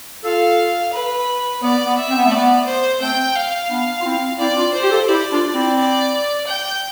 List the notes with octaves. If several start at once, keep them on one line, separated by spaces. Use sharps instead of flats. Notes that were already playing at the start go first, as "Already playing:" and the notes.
F4 A4 F5
B4
B3 D5
B3
E5
C4
B3
A3
B3 D5
C5
A3 C4 G5
F5
B3 D4
F4
C4 E4
C4 E4 D5
D4 F4
C5
G4
F4 A4
E4 G4 D5
D4 F4
C4 E4
D5
G5